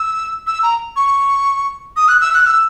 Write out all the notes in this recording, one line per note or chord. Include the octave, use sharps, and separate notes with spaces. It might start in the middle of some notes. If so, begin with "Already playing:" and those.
Already playing: E6
E6
A#5
C#6
D#6
F#6
E6
F#6
E6